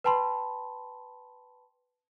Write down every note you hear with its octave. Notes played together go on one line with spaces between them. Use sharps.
B4 G5 A5 B5 C6